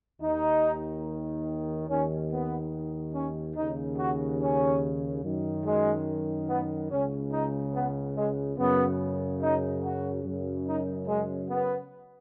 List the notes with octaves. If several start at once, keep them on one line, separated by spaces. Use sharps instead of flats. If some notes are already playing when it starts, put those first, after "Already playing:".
D#2 D#3 D#4
D#2 D#3 C#4
B3
C#4
D#2 C#3 D#4
F#4
C#4
F#2 D#3
G#3
B3
C#2 C#3 C#4
D#4
B3
G#3
F#2 C#3 B3
D#4
F#4
F#2 C#3
D#4
G#3
B3